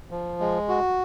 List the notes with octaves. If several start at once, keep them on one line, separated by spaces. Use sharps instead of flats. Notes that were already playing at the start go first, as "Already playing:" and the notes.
F3
G#3
F#4